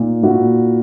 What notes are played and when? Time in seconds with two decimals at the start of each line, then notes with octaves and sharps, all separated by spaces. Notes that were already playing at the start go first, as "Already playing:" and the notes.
Already playing: A#2 D#4
0.23 A#2 E4 F#4